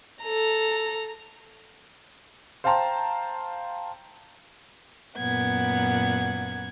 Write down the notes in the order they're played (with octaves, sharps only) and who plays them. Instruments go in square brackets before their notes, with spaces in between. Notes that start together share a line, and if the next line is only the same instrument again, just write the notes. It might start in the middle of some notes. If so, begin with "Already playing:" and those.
[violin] A4 A#5
[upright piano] C5 F5 G5 A5 A#5 C6
[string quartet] F#2 A#2 B3 F#5 G#6